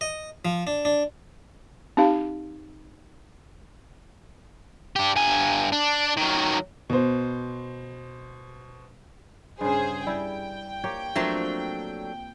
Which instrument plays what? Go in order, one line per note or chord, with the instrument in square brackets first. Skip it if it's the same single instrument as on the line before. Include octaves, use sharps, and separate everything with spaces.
[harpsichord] D#5
F3
D4
D4
[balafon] C4 D#4 G4 F5
[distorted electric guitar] D4 G4
G2 G#5
D4
D#3 F#3
[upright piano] B2 C5
[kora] G2 C#3 [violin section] G#4 C5
[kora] G3 E4 [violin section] G5
[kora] A#3 G4 C#5
[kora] F3 A#3 C4 [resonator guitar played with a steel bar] F#3 A3 D4